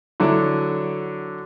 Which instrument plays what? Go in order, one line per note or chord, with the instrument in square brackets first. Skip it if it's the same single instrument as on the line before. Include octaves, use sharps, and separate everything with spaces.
[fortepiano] D3 F#3 D4 E4